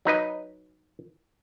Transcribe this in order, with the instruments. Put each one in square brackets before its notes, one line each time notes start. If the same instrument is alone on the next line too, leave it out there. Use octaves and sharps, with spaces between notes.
[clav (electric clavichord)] F#3 D#4 B4 D#5